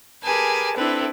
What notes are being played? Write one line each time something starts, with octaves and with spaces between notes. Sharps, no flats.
G4 G#4 A#4 B4 G#5 A5
C4 D4 E4 A4 B4